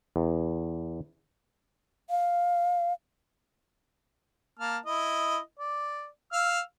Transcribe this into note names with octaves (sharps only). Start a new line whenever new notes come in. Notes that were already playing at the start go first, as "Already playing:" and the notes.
E2
F5
A#3 A5 F6
E4 D#5
D5
F5 E6 F6